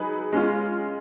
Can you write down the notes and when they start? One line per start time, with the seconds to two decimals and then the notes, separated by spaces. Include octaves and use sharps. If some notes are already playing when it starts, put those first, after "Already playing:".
Already playing: F#3 D#4 G#4 B4
0.32 G#3 C#4 F4